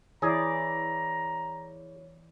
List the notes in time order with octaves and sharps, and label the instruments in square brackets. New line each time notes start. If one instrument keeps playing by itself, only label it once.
[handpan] E3 E4 D5 [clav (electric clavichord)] G#4 [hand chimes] C#5 [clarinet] A#5